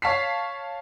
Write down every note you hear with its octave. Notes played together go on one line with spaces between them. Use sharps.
C#5 F5 A5 B6 C7